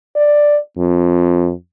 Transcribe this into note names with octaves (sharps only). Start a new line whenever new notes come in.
D5
F2